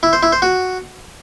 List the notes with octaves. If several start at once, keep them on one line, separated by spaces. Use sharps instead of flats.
E4
C5
E4
C5
F#4